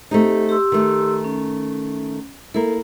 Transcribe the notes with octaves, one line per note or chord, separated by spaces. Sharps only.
A3 C4 D#4 G4
G4 C6 E6
D#3 A3
C#4
A#3 E4 A4